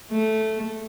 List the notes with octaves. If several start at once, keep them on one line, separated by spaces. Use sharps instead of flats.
A3